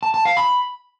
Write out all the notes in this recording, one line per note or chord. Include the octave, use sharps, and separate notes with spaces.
A5
A5
F5
B5